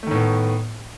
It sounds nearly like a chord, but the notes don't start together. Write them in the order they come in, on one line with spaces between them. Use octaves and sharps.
A3 D#3 A2 B3